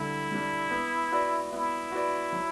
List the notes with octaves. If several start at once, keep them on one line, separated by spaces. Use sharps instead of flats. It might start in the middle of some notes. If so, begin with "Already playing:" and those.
Already playing: D3 G3 D4 E4
G3 D4
B3
F#4 B4 D5
B3 E4
F#4 B4 D5
F#3